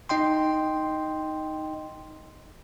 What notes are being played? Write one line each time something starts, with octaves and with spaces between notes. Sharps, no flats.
D#4 D#5 G5 C6